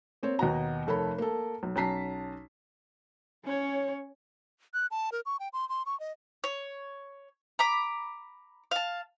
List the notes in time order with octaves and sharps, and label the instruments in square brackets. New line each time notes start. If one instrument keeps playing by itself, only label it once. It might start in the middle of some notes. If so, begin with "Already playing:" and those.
[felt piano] A#3 C4 C#5
D#2 B2 F#4 A#5
F1 A4 A#4 C#5 B5
A#3 A4
B1
B1 C#4 A5 A#5 B6 C7
[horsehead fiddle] C#4 C#5
[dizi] F#6
A5
A#4
C#6
G5
C6
C6
C#6
D#5
[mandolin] C#5
A#5 B5 D6
F5 A5